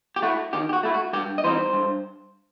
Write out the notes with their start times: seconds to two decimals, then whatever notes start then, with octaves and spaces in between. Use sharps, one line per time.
0.16 G4
0.22 A3 E4 F#4
0.53 D#3 G4
0.69 G4
0.73 F#4
0.83 A3 E4
0.94 F#4
1.13 G2 G4
1.38 D#5
1.44 E3 G3 C4 D#4 C5
1.73 G2